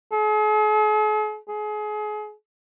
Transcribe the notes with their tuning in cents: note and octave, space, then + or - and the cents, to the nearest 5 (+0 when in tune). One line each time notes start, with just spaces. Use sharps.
G#4 +45
G#4 +30